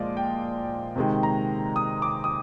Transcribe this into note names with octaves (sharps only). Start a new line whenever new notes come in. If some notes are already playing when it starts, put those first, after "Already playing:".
Already playing: A#2 F3 G#3 D5 D#5 F5
G5
C3 D#3 G#3
A#5
D#6
D6
D#6